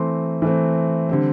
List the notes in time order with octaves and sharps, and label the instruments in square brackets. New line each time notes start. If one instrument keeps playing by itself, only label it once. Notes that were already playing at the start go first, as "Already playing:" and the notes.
Already playing: [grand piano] E3 A3 C4 C6
E3 A3 C4
D3 G3 C4